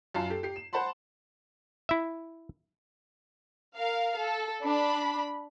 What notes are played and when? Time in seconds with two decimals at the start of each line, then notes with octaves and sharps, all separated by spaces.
0.14 F#2 F4 A5 C7
0.30 G4 A4
0.43 G4 C7
0.56 E7
0.73 C5 F#5 A5 B5 C6
1.89 E4 E5
3.76 A#4 F5
4.18 A4
4.63 D4 B5